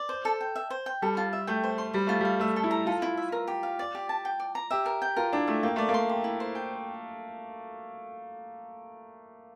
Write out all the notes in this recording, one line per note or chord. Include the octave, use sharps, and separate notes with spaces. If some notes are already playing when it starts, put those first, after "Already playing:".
Already playing: D5
C5
A4
G5
E5
C5
G5
G3 A4
F4
E5
A3 G5
C5
C6
G3 C5
A3 F4
G3
F5
A3 E5
A4
E4
A#5
F4 A4
E4
E5
A#4
G4
F5
D5
G4
A5
G5
D5
A#5
G4 E5
A#4
G5
F4 A#4
D4 E4
A3 E5
A#3 G5
A3 D5
A#3
C6
G4
E4
C5
G5